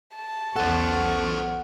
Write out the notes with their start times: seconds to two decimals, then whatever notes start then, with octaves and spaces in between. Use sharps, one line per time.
0.15 A5
0.56 B1 E2 A4 C5 F#5 C#6